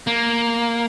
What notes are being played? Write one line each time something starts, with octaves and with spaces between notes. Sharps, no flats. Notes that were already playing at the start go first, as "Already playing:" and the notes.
A#3